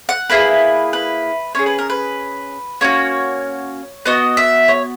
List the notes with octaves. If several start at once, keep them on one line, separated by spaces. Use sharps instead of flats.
F#5
A#3 E4 G#4 B4
B4
C#4 G#4 C#5
B4
A#4
B4
A#3 C#4 F#4 C#5
B3 F#4 D#5
E5
C#5